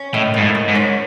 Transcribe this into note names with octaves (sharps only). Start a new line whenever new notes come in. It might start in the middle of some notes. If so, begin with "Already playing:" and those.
Already playing: C#4
A2 D#3
G#2 D#3
A2
D#3
G#2
C#4